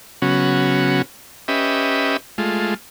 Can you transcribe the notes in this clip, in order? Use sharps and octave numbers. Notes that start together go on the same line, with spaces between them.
C#3 F#3 B3 C#4 F#4
C#4 G4 B4 D#5 E5
G#3 A3 F4